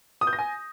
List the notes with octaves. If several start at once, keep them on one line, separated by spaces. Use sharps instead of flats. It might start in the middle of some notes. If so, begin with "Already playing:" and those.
D#6
G6
A#6
G#5